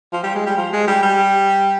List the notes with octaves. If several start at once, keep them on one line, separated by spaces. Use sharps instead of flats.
F3
G3
G#3
G3
F3
G#3
G3
G3